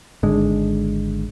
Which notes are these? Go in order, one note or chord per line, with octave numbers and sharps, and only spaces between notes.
G#1 D3 G#3